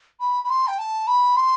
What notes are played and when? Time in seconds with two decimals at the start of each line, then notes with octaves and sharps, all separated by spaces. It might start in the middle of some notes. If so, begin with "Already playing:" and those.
0.20 B5
0.44 B5
0.50 C6
0.67 G5
0.79 A5
1.07 B5
1.36 C6